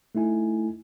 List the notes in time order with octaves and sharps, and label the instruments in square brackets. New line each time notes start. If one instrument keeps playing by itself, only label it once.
[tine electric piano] A3 D#4 E4 G#5